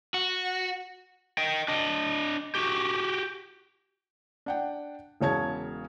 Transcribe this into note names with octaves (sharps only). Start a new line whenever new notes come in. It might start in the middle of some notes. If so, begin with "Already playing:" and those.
F#4
D#5 G5
D4 D#5
F#4 G4
D4 F#5 G5
E1 C#3 C#5 A5 G#6